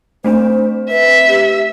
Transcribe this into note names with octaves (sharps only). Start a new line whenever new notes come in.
A3 C4 D4 C5
B4 E5
G4